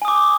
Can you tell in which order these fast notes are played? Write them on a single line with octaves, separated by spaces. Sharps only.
G#5 D#6 D6